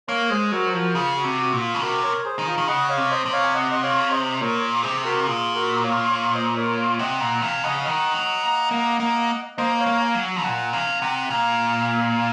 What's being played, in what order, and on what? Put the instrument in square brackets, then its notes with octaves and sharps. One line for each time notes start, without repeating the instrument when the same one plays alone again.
[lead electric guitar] A#3 [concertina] C#5 F5
[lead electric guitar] G#3 [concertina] G#4 C5
[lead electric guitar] F#3 [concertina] F#4 A#4
[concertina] C5
[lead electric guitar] F3 [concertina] F#4 A#4
[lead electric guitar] C#3 [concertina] F4 G#4
[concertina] F#4
[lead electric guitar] C3
[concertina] F#4
[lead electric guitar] A#2
[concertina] F4
[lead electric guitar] C#3
[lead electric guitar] C3 [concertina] F#4 A#4
[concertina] A#4 C#5
G#4 C5
[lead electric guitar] D#3
[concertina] F4 G#4
[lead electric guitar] D#3
[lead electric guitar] C#3 [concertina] D#5 F#5
[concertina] C#5 F5
[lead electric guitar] C3
[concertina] C5 D#5
[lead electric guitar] C3
[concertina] C#5 F5
G#5
D#5 F#5
D#5
C#5 F5
C5 D#5
[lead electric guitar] A#2 [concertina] A#4 C#5
[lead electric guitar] C3 [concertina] G#4 C5
[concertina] F#4 A#4
[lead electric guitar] A#2 [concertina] F4 G#4
[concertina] F#4 A#4
C#5 F5
C#5 F5
C5 D#5
A#4 C#5
C#5 F5
[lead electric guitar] C3 [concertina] D#5 F#5
[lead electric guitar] A#2 [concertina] F#5 A#5
[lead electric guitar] C3 [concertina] F5 G#5
[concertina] G#5
[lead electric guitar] C#3 [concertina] D#5 F#5
[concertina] F5
[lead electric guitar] D#3 [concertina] D#5 F#5
[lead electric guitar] F#3
A#3
A#3
A#3
[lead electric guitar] A#3 [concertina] C5 D#5
[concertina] C#5 F5
[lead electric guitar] A#3
[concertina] F5 G#5
[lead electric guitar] F#3
[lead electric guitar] A#2 [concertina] F#5 A#5
[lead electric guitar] C3 [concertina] F5 G#5
[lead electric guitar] C3 [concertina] F#5 A#5
[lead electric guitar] A#2 [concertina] F5 G#5